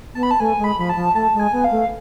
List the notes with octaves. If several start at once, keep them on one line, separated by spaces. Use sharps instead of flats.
B3 A5
B5
A5
A3 G#5
G#3
B5
F3 B5
A5
F3
A3 A5
G#3
G#5
B3
F5
A3